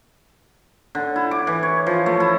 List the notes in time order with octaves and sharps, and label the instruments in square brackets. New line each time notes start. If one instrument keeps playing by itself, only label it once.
[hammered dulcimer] D3
E4
D6
E3
C#5
F3
A3
E4